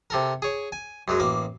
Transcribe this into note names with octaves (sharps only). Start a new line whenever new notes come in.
C3 A4 A#4
G#4 C#5
G#5
F#2 F#3 G#3
A1 A#3 D6